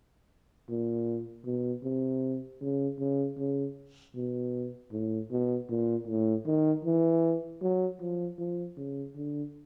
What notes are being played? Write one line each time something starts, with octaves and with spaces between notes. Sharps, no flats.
A#2
B2
C3
C#3
C#3
C#3
B2
A2
B2
A#2
A2
D#3
E3
F#3
F3
F3
C#3
D3